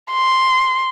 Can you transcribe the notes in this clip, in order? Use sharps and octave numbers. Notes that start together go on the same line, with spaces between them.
C6